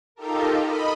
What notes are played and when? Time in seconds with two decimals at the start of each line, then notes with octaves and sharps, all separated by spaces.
0.15 D#4 F4 G4 A4 A#4
0.61 D#5 B5